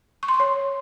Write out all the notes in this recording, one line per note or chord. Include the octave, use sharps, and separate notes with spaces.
C#6
C6
C#6
C#5